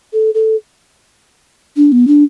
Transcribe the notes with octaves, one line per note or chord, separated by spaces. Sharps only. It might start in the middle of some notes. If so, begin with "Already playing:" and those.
A4
A4
D4
B3
D4